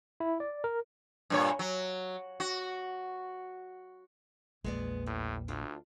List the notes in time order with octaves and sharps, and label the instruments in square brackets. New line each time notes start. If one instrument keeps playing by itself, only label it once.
[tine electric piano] E4
D5
A#4
[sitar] G2 A#2 C#5
F#3
F#4
[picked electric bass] A#1 A#2 [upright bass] E2 A#3 [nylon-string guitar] G#3 B3 D5
[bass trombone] A2 [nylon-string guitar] G3
[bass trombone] D2 [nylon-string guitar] D4 F4